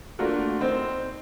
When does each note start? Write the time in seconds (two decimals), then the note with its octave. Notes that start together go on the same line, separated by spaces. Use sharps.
0.19 A3 A#3 D4 F4 F#4 A#4
0.61 C4 D#4 C5